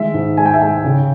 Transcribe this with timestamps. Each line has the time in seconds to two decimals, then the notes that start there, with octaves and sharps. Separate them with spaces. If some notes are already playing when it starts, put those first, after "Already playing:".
Already playing: D#3 G#3 E5
0.14 G#2
0.37 G#3 G#5
0.46 G5
0.54 E5
0.61 G#3 G5
0.84 C#3